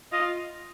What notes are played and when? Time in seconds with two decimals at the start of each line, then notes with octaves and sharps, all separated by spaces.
0.12 F4 D#5